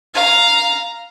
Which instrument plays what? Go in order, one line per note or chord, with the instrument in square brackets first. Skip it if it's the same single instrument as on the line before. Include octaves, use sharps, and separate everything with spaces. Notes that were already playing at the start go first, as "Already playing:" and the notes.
[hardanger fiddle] F5 A#5